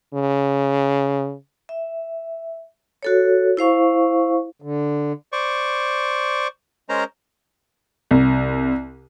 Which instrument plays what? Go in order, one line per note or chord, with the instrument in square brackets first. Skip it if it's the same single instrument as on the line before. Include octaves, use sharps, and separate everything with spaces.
[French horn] C#3
[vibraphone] E5
F#4 A4 C#5
E4 C5 F5 C#6
[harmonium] D3
[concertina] C5 D5 C#6
G#3 C#4 A#4 C5 A#5
[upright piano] C2